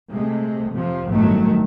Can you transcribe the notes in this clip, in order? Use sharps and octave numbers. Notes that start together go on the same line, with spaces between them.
C3 G#3 A3
F2 C3 F3
G1 F#2 A2 D#3 F#3 A3